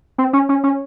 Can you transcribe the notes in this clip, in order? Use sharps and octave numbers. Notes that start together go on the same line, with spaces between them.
C4
C#4
C#4
C#4